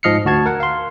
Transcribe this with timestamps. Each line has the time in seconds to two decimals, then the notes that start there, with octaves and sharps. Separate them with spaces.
0.03 G#2 F3 D#5 F6 C7 C#7
0.25 D2 F#4 A5 G#6
0.46 A#4 F#5
0.60 F5 C6